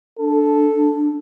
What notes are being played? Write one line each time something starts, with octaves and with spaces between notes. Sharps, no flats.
D4 A4